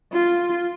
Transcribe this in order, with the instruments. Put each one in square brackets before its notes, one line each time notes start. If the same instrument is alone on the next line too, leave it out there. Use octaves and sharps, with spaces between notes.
[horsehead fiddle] F4